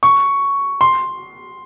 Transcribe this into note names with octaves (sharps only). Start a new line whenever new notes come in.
C#6
C6